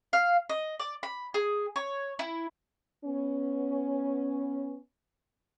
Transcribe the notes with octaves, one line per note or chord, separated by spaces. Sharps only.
F5
D#5
D5
B5
G#4
C#5
E4
B3 C#4